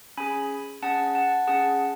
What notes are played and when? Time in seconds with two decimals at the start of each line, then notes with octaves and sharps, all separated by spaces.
0.17 C#4 G#4 G#5 B5
0.83 C#4 G#4 F#5 A5
1.15 F#5 A5
1.47 C#4 G#4 F#5 A5